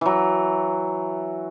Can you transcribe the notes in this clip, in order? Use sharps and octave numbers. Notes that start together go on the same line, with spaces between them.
E3 F#3